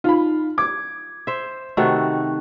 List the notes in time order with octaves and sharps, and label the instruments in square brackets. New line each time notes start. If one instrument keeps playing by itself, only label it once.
[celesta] D#4 [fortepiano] F4 B5
[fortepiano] D6 [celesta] G#6
[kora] C5 E5
[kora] C3 D#3 A3 [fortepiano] F#4 [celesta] C#6 F#6